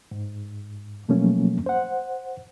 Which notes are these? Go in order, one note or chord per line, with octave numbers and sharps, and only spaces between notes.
G#2
B2 F3 F#3 A3 A#3 C#4
C5 F#5